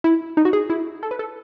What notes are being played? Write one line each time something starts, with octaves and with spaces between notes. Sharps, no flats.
E4
D#4
F#4
G#4
E4
A4
B4
A4